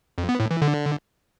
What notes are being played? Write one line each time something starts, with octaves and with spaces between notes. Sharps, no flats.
F2
B3
A2
E3
D3